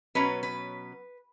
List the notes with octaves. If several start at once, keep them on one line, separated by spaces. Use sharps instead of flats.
B2 F#3 C#4 B4
B4